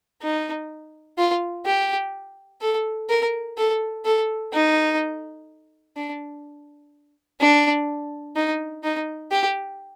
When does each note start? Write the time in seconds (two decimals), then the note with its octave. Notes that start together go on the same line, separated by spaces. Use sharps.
0.22 D#4
1.18 F4
1.66 G4
2.61 A4
3.09 A#4
3.58 A4
4.05 A4
4.53 D#4
5.96 D4
7.40 D4
8.36 D#4
8.83 D#4
9.31 G4